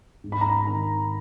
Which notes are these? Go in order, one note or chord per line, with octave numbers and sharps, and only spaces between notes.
G#2
B5
A#5
B5
D#3